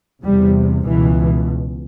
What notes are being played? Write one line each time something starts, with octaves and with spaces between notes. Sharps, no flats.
E2 C3 G3
C#2 B2 E3